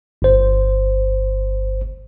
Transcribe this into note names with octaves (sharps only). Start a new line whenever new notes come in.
G1 C5